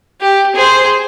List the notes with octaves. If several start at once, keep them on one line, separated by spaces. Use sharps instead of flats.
G4
G#4 C5